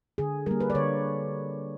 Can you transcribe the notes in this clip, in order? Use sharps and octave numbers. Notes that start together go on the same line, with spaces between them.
D3 G#4
G3 A#3 A#4
B4
D5
D3 C#5